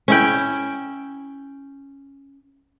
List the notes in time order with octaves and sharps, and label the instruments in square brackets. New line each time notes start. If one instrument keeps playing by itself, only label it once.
[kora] C#4 E4 G5